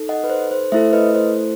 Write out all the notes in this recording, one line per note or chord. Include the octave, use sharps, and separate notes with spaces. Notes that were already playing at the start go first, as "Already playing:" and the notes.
Already playing: D#4 A4
D#5 F#5
B4
C5
C5
A3 E4 A4 C5 E5
B4 D#5
C5